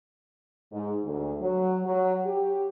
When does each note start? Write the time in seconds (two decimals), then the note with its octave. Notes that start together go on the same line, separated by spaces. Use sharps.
0.72 G#2
1.04 D2
1.40 F#3
1.83 F#3
2.25 G4